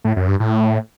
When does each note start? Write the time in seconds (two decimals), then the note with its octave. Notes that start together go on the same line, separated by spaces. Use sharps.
0.04 A2
0.16 F#2
0.28 G2
0.40 A2